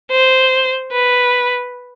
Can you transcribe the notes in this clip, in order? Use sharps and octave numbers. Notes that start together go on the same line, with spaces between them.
C5
B4